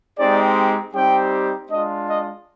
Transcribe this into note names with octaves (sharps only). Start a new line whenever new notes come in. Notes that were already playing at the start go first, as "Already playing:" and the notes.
G#3 C4 D#4 G4 D5
G3 C4 D#4 G4 G5
G#3 D4 F4 D#5
D#5